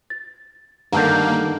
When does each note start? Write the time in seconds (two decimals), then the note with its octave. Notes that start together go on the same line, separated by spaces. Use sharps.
0.10 A6
0.92 G2 D3 D#3 A3 A#3 F#5 A5 G6